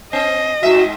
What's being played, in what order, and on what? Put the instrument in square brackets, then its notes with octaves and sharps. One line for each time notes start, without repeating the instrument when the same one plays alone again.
[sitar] C4 [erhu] D#5
[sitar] G#2 E5 [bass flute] F#4